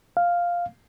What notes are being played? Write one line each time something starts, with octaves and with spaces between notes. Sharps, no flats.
F5